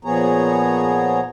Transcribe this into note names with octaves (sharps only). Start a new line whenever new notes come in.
A#2 F3 B3 G#4 C#5 A#5